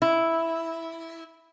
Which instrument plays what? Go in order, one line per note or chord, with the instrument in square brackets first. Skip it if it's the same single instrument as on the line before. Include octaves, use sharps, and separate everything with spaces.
[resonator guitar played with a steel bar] E4